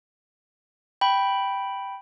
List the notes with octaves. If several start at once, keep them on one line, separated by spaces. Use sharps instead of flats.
G5 B5